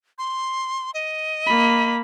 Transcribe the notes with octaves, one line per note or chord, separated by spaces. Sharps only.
C6
D#5
A#3 B5